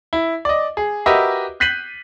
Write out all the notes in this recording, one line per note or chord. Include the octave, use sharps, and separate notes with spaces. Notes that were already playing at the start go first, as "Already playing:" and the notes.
E4
D5 D#5
G#4
F#4 G4 A#4 B4 D#5 E5
F#6 G6 B6 C7 D#7 F#7